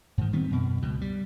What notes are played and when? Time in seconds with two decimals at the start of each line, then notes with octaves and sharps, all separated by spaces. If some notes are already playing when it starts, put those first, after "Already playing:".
0.18 G#2 D#3
0.33 D#3 G3 B3 C4
0.50 F#2 B2
0.82 C#2 B2
1.01 G3